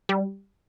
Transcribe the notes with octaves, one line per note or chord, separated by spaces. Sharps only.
G3